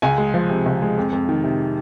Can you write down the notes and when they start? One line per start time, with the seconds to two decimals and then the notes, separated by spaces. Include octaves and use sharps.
0.02 C#2 G#5
0.18 G#3
0.34 F3
0.49 C3
0.66 C#2
0.82 G#3
0.98 F2
1.12 F2
1.29 D#3
1.44 C3